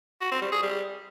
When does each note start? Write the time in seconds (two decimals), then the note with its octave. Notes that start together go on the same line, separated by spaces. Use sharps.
0.21 F#4
0.31 C4
0.42 G3
0.52 G#4
0.62 G3